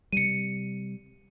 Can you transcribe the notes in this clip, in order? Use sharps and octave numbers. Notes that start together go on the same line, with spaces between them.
C3 G3 C#7 D#7